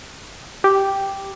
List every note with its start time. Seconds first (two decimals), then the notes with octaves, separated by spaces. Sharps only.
0.64 G4